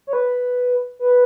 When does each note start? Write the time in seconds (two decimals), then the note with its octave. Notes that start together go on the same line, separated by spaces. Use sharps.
0.07 C#5
0.13 B4
0.99 B4